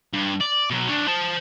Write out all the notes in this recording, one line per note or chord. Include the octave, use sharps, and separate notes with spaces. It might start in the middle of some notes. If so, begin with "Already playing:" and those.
G2
D5
B2 F#3
D4 C#5
C5 A5